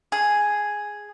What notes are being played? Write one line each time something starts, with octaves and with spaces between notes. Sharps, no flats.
G#4